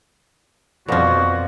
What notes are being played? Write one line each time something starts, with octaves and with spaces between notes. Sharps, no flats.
F2 B2 F3 F#4 D5 F5 E6